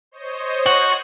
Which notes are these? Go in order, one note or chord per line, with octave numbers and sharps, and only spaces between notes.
C5 C#5 D#5
F#4